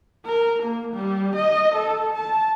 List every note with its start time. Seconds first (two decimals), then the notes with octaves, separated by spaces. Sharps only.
0.25 A#4
0.63 A#3
0.94 G3
1.36 D#5
1.75 A4
2.14 A5